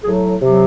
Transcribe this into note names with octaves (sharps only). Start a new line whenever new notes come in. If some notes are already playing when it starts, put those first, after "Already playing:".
A2 F#3 G#4
C3 F#3